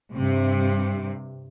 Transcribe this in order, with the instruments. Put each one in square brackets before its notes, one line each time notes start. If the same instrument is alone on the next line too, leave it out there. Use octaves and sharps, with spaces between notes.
[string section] G2 C3